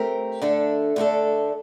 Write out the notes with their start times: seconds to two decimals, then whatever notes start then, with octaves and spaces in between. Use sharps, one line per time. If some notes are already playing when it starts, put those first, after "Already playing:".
Already playing: A3 C4 G4 A#4
0.42 D3 A3 D4 A4
0.96 D3 A3 D4 A4